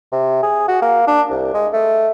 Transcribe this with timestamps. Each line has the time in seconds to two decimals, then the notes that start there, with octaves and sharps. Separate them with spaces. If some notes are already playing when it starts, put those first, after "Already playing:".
0.12 C3
0.42 G#4
0.68 F#4
0.82 A#3
1.07 D4
1.30 C2
1.54 G#3
1.73 A3